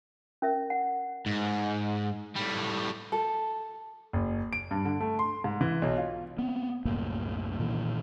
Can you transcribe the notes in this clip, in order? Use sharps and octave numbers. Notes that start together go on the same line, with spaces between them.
C#4 A#4 E5
F#5
G#2
A2 G3
A4
F#1
D7
G2
D3
A3
C6
G#2
E3
B1
F4
B3 C4
C2 F#2 A2 A#3
A#2 D#3 E3